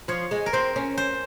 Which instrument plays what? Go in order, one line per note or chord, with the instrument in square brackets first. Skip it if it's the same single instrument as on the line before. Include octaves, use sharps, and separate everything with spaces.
[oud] F3 [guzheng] C#5
[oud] G#3
[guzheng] A#4
[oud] C4 [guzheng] C5
[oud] C#4
[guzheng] C5